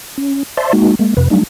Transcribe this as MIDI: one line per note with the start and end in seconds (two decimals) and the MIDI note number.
0.18 0.43 61
0.57 0.73 72
0.57 0.73 74
0.57 0.73 76
0.57 0.73 81
0.57 0.73 84
0.73 0.95 56
0.73 0.95 58
0.73 0.95 63
0.73 0.95 66
0.99 1.14 56
0.99 1.14 58
1.17 1.28 41
1.17 1.28 48
1.17 1.28 71
1.30 1.43 54
1.30 1.43 55
1.30 1.43 57
1.30 1.43 62
1.30 1.43 63